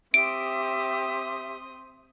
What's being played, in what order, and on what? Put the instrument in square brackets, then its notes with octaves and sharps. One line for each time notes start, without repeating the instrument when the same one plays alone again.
[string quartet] C4 C6 D#6 [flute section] G4 E5 D6 [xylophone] D7